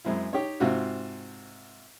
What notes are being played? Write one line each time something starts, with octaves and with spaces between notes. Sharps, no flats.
F#2 G#3 C4 E4
D#4 G4 C#5
G#2 C3 C4 F4 F#4